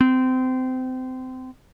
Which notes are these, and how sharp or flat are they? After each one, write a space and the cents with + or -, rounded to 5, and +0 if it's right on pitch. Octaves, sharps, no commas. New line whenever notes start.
C4 -25